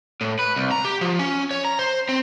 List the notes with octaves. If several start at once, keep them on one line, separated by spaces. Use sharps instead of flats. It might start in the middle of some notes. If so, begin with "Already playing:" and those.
A2
B4
C2
A#5
G4
F3
C#4
C#5
A#5
C5
C4